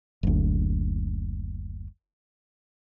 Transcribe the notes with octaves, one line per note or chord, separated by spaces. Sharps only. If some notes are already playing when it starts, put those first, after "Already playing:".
F#1 D2